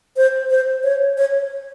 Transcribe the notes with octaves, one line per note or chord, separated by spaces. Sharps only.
C5
C5
C#5
C#5